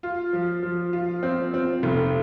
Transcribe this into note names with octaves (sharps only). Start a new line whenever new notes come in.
F4
F3
F3
F4
C4
C4
F1